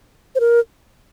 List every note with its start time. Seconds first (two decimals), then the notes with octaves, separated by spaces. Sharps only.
0.35 C5
0.40 A#4